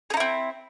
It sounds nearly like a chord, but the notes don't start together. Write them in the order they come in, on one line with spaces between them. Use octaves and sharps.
G#4 D#4 E4 C4